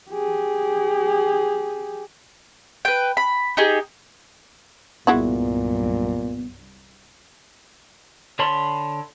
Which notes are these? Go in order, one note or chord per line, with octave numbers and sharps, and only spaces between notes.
G4 G#4
B4 G5
B5
D#4 G4 G#4
C2 G2 A#2 F#3 G#3 B3 E4 F#4
D3 C#5 A5 B5 C6